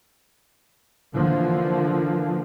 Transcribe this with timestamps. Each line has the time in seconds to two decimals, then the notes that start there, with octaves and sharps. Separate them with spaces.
1.15 D3 E3 F3 A#3